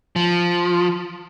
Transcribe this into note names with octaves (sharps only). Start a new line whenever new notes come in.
F3